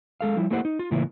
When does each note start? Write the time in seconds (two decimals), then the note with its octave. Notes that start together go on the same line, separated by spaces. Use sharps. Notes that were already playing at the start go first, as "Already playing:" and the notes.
0.21 G#3 A4 F5
0.37 F3 G3 E4
0.51 A3 A#3 E4 G4 C5 F#5
0.65 D#4
0.79 F4
0.91 A2 C#3 E3 A#3 E4 F4